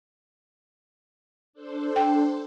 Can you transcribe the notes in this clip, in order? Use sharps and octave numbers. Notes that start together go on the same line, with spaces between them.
D4 A4 C5
G5